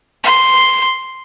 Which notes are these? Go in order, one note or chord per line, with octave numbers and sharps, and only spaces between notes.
C6